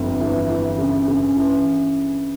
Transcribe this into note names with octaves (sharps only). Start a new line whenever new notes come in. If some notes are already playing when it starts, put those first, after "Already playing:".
Already playing: G1 F2
E3
E3
C#3
C#3
E3